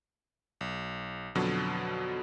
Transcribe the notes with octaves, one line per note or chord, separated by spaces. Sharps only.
B1
F2 B2 D3 F#3